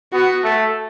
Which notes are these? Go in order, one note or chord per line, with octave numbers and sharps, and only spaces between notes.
B3 F#4
A3